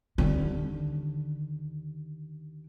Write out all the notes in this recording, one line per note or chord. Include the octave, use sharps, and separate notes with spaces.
D#2 D3